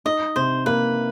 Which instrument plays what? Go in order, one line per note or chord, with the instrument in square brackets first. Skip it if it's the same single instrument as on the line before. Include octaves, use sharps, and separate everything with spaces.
[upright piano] D#4 [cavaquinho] D#5
[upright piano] C3 [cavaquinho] C5
[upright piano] A#3 [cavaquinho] B4